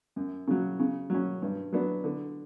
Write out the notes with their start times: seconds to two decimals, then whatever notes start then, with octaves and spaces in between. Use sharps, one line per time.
0.16 F#2
0.47 C#3 F#3
0.79 C#3
1.10 F#3 C#4
1.42 G2
1.73 F#3 B3 D4
2.04 D3